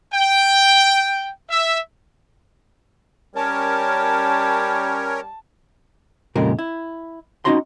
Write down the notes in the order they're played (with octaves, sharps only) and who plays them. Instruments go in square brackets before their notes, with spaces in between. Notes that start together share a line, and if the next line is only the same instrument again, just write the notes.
[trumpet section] G5
E5
[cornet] G3 [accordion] C#4 A#4 C#5 [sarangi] A5
[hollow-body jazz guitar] F2 A#2 C#3 G#3 G4 A#4
E4
C4 C#4 D#4 F#4 A#5 C6